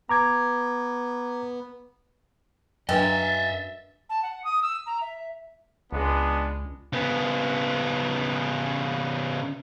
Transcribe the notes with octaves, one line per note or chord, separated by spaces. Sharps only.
B3 A#5 D6 G#6
F#2 D4 B4 D#5 E5 G5 A6
A5
F#5
D#6
E6
A#5
E5
C#2 G#3 B3 D4
C#3 B3